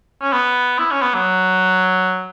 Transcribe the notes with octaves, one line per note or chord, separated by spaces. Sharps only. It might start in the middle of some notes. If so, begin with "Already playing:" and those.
C#4
B3
E4
C#4
B3
F#3